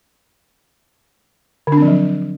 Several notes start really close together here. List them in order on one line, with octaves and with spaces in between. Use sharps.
D3 D4 C4 F3 F#3